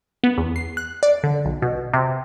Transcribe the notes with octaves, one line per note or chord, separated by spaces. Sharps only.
B3
E2
C7
F#6
D5
D3
B1
B2
C3